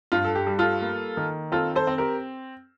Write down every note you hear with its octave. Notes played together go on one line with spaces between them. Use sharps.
G2 F4
A4
G4
G3
F4 A4
A#3
D#3
C4 F4 A4
A4 C5
C4
G4 A#4